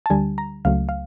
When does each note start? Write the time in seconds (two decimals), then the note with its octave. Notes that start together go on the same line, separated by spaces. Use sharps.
0.06 A5
0.10 D2 D3 G3 G#5
0.38 A#5
0.65 C#2 C#3 F#3 A3 F5
0.89 F5